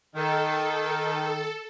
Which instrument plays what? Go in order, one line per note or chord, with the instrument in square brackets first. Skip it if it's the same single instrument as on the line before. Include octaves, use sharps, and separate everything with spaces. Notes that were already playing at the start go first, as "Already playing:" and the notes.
[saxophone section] D#3 [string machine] A4